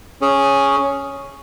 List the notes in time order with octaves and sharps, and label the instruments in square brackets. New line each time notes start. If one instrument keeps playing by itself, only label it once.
[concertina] C#4 G#4